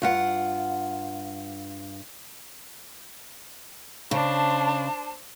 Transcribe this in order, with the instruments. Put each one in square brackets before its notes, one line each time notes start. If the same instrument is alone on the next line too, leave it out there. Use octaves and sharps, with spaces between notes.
[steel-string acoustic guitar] G2 F4 F#5
[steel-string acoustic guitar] C#3 [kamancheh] D4 C5 [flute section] A5